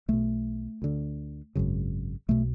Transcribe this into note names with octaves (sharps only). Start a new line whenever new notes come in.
B1 B2 A3
D2 D3
G#1 F#2 C#3
B1 B2 A3